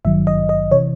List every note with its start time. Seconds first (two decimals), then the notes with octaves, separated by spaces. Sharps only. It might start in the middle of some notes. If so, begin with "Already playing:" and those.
0.05 G#1 G2 D#3 F#3 E5
0.27 D#5
0.49 D#5
0.71 C3 E3 C#5